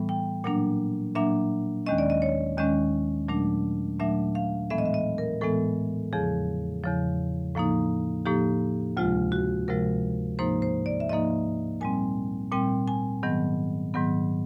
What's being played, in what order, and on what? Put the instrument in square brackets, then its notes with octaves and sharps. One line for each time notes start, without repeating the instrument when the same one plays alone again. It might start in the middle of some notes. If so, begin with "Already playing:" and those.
Already playing: [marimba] A2 E3 G3 B3
G5
A#2 F#3 A#3 D4 F#5
A#2 F#3 A#3 D4 E5
D#2 D#3 G#3 C#4 D#5
D5
D#5
C#5
D#2 D#3 G#3 C#4 D#5
A#2 F#3 A3 D4
A#2 F#3 A3 D4 E5
F5
A2 E3 G#3 B3 E5
D#5
E5
D#5
A#4
A2 E3 G#3 B3 A4
E2 C#3 F3 G#4
E2 C#3 F3
A2 F3 A#3 D#4
A2 F3 A#3 D#4 G4
D2 C3 F3 G#3 F4
F#4
D2 C3 F3 G#3 A#4
G#2 F3 A#3 D#4 C5
C5
D5
E5
G#2 F3 A#3 D#4 D#5
A#2 G3 C4 G#5
A#2 G3 C4 G5
G#5
G#2 D#3 F#3 B3
G#2 D#3 F#3 B3